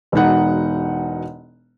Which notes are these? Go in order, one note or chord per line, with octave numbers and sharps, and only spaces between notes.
E1 B2 D#4 F#5